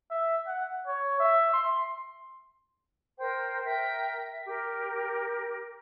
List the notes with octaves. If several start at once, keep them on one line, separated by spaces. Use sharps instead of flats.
E5
F#5
C#5
E5
C6
A#4 C5 G5
A#4 E5 G5
E5
G4 A#4